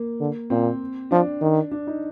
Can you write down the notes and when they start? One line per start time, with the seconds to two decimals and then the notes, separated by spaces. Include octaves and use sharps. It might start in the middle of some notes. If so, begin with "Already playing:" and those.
Already playing: A#3
0.20 D3
0.50 A#2 C4
1.11 F3 D4
1.41 D#3
1.71 D4
1.87 D#4